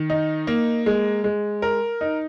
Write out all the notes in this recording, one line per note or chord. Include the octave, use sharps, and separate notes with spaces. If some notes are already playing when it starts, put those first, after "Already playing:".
Already playing: D#3
D#4
A#3
G#3
G#3
A#4
D#4